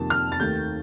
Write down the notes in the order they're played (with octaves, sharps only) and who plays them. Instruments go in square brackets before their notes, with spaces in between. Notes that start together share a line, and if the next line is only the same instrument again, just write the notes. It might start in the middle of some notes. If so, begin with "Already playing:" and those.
Already playing: [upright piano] F2 C3 D#3 A#3 A5
F6
A6
D#2 D#3 A3 G6